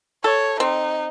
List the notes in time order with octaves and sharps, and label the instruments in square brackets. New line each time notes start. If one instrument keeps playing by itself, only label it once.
[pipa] A4 [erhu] C#5
[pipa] C4 [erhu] D#4